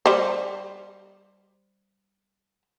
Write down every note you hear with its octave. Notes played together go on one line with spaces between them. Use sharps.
G3 C5